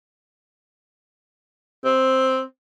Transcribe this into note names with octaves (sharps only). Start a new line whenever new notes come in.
C4